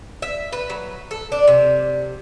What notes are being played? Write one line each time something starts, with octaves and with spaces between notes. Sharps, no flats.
E5
B4
F#3
A4
D4
C3